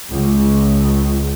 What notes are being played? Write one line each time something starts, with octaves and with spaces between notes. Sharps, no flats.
C#2